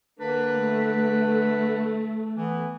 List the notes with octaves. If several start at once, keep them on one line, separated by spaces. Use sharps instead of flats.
D3 A#3 D4 B4
A3
E3 B3